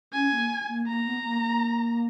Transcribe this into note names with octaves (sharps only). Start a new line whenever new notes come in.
C#4 G#5
A#3
A#3
A#3 A#5
B3
A#3
A#3